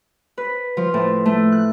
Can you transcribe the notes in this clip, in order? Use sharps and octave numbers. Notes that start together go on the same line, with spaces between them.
B4
F3
A2
A3
F#6